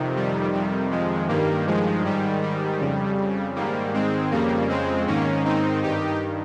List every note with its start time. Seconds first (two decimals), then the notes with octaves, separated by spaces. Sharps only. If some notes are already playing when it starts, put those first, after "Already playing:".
Already playing: F2 C3 D#3
0.16 G3
0.53 F2 C3 D#3 G3
0.91 F3 G#3
1.28 G2 D#3 G3 A#3
1.67 F3 G#3
2.04 G#2 D#3 G3
2.42 G3
2.80 F2 C#3
3.56 G#2 D#3 G3 A#3
3.94 G#3 C4
4.31 F2 C#3 G3 A#3
4.69 G#3 C4
5.07 G#2 D#3 A#3 C#4
5.45 C4 D#4
5.82 G2 D#3 D#4 G4